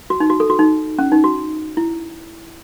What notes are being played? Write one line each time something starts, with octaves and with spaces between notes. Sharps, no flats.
F#4
D#4
F#4
A4
F#4
D#4
C#4
D#4
F#4
E4